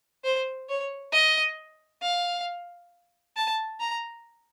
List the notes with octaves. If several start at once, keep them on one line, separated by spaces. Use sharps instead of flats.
C5
C#5
D#5
F5
A5
A#5